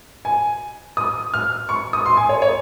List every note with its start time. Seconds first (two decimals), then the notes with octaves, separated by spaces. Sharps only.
0.25 G#5
0.97 D#6
1.34 F6
1.69 C#6
1.93 D#6
2.06 C6
2.17 G#5
2.29 C#5
2.42 C#5